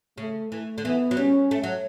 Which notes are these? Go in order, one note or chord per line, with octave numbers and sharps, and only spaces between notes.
C#3 A3
E3 A3
D3
E3 B3
F#3
G3 C#4
A3
F#3